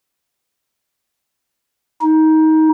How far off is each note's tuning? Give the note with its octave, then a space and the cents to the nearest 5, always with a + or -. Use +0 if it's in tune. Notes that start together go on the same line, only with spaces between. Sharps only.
D#4 +20